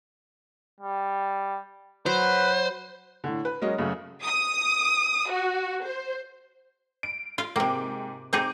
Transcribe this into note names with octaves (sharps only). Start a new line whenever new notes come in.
G3
F#3 B4 C5
A2 D3
B4
F#3 G#3 C#4 A#4 D#5
F#2 C#3 A3
D#6
F#4
C5
D7
F4 F5
G#2 C3 A#3 G5 D6
C4 D#4 G#4 D6 G6